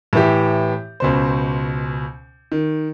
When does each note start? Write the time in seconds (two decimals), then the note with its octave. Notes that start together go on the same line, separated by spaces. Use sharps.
0.13 A2 E3 G4
1.00 C#2 B2 C5
2.52 D#3